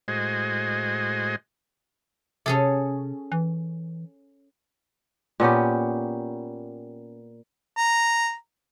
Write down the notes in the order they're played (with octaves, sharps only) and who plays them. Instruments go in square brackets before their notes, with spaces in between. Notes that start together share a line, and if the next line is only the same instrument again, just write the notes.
[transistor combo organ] A2 G#3 F#4 C5 D#5 G#5
[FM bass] C3 [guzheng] C#4 G#4 A4
[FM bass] E3
[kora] A#2 B3 C#4 G4
[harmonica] A#5